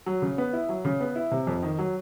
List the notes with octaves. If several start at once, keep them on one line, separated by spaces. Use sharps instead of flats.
F#3
C#3
B3
E4
F#3
C#3
B3
E4
C3
F2
D#3
F#3